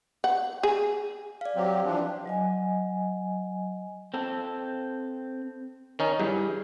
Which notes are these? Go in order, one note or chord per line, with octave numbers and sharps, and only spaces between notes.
F#5
G#4
D5 F5
F#3 C4 G4
E3 F3 D4
F#3 D#5 G#5
C4 A4
D#3 C#4 D#4
G2 G3 E4 G#4